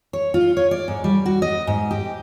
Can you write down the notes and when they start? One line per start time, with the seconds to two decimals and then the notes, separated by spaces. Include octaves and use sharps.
0.13 C#5
0.34 F4
0.57 C#5
0.71 D5
0.88 G#2
1.04 G3
1.26 F#4
1.42 D#5
1.67 G#2
1.91 G4